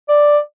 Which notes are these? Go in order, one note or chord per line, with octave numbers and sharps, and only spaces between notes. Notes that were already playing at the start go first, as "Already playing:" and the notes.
D5